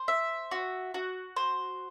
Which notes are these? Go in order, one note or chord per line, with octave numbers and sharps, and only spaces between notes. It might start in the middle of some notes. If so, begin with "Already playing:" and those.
Already playing: C5
E5
F#4
F#4
C5